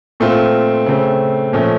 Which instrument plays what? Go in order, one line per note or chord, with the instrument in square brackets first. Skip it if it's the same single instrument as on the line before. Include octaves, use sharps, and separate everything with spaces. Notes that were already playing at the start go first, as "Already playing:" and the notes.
[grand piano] A#2 A3 C4 F4
C#3 A3 C4
A#2 F3 A3 C#4